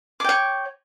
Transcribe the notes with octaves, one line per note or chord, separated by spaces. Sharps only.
C#5 G5 D6